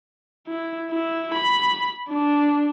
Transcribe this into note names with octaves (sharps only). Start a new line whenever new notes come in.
E4
E4
B5
D4